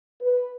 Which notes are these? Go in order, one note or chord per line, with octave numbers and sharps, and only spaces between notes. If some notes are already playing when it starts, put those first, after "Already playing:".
B4